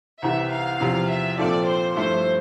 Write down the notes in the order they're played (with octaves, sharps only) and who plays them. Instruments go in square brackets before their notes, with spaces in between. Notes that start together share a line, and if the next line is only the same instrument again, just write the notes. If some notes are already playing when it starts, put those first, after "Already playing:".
[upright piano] C2 C3 E3 [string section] E5
[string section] F5
[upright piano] E2 C3 F3
[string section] E5
[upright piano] A#2 F3 C4 F4 A4 [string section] D5
[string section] C5
[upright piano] G2 F3 A3 E4 [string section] C5